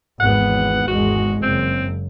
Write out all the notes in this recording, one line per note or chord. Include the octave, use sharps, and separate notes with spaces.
G#1 E2 B3 F#5
G#1 E2 G#3 F#4
F#1 C4